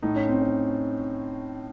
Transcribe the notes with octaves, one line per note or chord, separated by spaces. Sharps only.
A2 D#4
C#4
C4
C#4